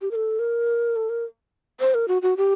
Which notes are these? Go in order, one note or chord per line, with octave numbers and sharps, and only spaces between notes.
G4
A#4
A4
A#4
A4
A#4
C5
A#4
F#4
F#4
G4